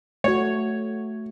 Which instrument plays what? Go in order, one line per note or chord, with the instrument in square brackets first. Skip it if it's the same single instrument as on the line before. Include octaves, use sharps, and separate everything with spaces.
[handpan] A3 F#4 [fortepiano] C#5